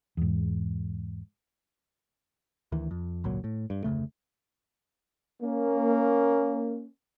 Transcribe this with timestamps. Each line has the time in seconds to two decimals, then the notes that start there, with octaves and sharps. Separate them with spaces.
0.17 E2 G#2
2.72 D2 D#3 E3
2.91 F2
3.24 G#1 C#2 A#2 F#3
3.44 A2
3.70 G2
3.84 F1 D2 C#3 A3
5.41 A#3 C#4